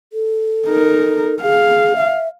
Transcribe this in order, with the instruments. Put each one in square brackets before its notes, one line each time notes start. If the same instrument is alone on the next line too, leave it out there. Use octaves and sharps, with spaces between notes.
[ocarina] A4
[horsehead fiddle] D#4 A#4
[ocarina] G#4 [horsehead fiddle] F5
[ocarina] E5